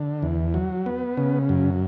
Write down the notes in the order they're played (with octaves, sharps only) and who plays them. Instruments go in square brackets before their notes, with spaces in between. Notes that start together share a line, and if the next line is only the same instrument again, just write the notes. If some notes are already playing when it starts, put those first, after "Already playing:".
Already playing: [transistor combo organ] D3
E2
F#3
B3
C#3
F#2